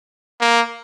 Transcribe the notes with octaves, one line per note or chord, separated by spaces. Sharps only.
A#3